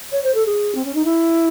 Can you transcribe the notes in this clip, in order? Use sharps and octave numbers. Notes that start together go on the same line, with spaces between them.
C#5
C5
A4
G#4
C4
C#4
D#4
E4